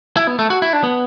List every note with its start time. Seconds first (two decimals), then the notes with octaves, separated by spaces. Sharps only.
0.17 E4
0.27 B3
0.39 A3
0.50 F#4
0.62 E4
0.73 D4
0.83 B3